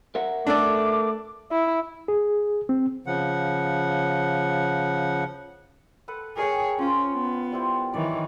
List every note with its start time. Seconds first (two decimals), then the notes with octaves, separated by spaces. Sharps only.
0.15 A#4 E5 F#5
0.47 A3 D4 A4 D5 D6
1.51 E4
2.08 G#4
2.69 C4
3.06 C#3 F3 F#5
6.08 A4 B4 F#5
6.37 G#4 A#4 C#5 G5
6.79 C#4 F4 C5
7.14 B3
7.52 G3 E4 C5
7.94 D#3 E3 C#5 D5